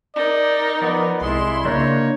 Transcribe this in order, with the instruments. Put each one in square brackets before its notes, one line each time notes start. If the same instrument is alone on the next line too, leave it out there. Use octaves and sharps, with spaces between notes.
[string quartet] D#4 A#4 [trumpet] D5
[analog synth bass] F3 [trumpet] B3 [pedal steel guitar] D5
[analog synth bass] C2 [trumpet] G#3 [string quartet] E4 C6
[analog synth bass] C#3 [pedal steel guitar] A#3 D4 D#4 [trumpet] C#5